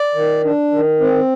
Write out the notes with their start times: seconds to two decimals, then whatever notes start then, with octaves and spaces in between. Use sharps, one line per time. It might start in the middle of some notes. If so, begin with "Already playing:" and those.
Already playing: D5
0.15 D#3
0.44 D4
0.72 D#3
1.00 C4